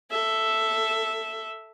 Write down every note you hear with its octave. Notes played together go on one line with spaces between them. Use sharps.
A4 E5